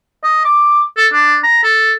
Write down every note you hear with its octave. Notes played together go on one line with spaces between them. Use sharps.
D#5
D6
A4
D4
A#5
A4